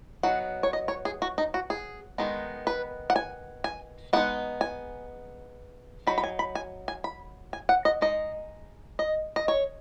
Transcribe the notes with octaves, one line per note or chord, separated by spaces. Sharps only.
F#3 B3 D#4 F#5
C#5
D#5
C#5
G#4
F#4
D#4
F#4
G#4
D#3 G#3 B3 D#4
B4
F#5
G#5
G#5
G#3 B3 D#4 F#5
G#5
F#3 D#4 B5
B5
G#5
B5
G#5
G#5
B5
G#5
F#5
D#5
G#3 D#4 D#5
D#5
D#5
C#5